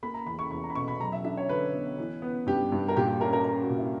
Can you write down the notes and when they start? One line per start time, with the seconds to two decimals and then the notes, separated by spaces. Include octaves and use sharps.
0.03 A#3 B5
0.14 A#5
0.27 E2 B5
0.39 C#6
0.51 E2 B5
0.64 A#5
0.70 B5
0.75 B2 C#6
0.88 B5
1.00 F#3 A#5
1.12 E5
1.24 D4 E5
1.37 C#5
1.49 D3 B4
1.73 B3
1.98 E3
2.22 B3
2.46 G2 G4
2.72 G2
2.88 A#4
2.96 A#2 G4
3.08 G4
3.20 C#4 A#4
3.33 A#4
3.44 C#4 A#4
3.61 F#4
3.69 A#2
3.78 E4